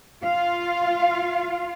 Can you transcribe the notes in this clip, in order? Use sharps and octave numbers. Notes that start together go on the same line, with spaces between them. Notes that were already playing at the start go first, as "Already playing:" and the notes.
F4 F5